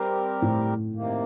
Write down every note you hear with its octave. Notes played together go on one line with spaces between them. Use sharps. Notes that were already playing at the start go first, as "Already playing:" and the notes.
Already playing: G3 C4 G4 A#4
A2
C3 D#3 A#3